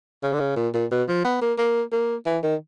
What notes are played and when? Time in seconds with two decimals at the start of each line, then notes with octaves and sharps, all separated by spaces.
0.23 C#3
0.33 D3
0.40 C#3
0.56 A#2
0.74 A#2
0.91 B2
1.08 F3
1.25 B3
1.41 A#3
1.58 A#3
1.92 A#3
2.26 E3
2.43 D#3